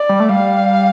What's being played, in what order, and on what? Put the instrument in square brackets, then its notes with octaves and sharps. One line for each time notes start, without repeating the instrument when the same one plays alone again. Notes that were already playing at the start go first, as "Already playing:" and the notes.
Already playing: [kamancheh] D5
[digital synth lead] G3
A3
[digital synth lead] G3 [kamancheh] F5